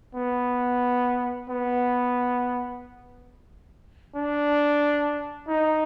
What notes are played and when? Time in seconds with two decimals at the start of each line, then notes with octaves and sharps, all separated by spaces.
0.15 B3
1.49 B3
4.16 D4
5.49 D#4